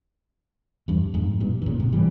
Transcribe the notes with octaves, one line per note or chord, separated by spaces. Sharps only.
E2 G2
F2 G#2
G2 A#2
E3
A#2 C#3
G#2 C3
E3 G3